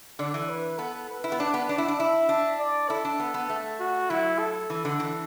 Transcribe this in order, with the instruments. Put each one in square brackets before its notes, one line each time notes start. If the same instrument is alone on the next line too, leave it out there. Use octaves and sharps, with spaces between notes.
[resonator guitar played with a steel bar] D3 [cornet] D5
[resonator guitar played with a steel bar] E3
[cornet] B4
[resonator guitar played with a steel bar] B3 [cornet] A4
[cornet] B4
[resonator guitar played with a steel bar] E4
B3
[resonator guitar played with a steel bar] D4 [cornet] D5
[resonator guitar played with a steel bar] B3
[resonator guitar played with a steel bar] D4 [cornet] D5
[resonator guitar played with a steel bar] E4
D4
[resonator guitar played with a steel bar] E4 [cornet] E5
[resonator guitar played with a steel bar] D4
[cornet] D5
[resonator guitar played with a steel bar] E4 [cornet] A4
[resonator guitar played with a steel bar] D4
B3
B3
A3
[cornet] F#4
[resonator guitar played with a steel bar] F#3 [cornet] E4
[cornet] A4
[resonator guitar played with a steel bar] E3
D3
E3